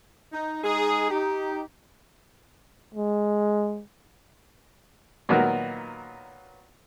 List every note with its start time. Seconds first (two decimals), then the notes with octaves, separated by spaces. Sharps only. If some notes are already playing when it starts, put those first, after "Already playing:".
0.33 D#4
0.64 G#3 D#4 G#4
1.10 D#4 G4
2.94 G#3
5.29 A#2 D#3 F#3 B3 F#4 A#4